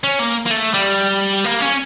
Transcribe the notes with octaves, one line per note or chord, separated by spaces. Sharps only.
C#4
A#3
A#3
A3
G3
A#3
C#4